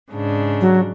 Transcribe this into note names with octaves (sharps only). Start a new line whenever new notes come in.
G#2 C#3 D4
F#3